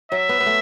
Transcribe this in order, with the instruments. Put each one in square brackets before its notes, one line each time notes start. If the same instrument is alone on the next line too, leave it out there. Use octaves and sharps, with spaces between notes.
[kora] F#3 [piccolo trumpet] E5
[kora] B3
B3
A3